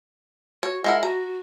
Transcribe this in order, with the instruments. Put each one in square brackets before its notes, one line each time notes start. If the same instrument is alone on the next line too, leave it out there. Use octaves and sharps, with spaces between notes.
[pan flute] F#4 [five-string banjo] C#5
[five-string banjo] G#3 E4 A#4 [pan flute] F#5
[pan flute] F#4 [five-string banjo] A#5